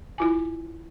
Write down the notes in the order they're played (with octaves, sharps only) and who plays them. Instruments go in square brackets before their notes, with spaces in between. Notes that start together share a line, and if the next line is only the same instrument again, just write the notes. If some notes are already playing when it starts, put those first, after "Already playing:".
[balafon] E4 F4 G#5